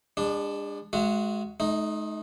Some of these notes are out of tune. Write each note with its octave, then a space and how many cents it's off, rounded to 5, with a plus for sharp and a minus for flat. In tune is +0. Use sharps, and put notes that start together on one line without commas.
G#3 -40 D4 +0
G#3 +20 F#4 +0 F5 -45
A3 -45 D#4 +0